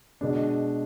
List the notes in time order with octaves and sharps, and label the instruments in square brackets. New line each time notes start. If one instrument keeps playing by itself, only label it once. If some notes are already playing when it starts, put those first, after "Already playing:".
[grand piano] B2 G#3 D4